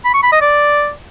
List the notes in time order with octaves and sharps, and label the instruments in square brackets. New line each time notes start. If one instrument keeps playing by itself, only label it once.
[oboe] B5
C#6
B5
D#5
D5